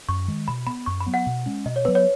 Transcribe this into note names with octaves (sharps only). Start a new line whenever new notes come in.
F#2 C#6
D#3 G#3
B2 B5
B3 B5
F#2 C#6
B5
F#3 B3
F#5
B2
G#3 C#4
B2 D#5
C#5
F#3 B3 B4
C#5